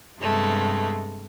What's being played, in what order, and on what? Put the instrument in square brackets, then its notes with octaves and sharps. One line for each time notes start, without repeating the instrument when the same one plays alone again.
[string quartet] G2 C3 G#3 A3 B3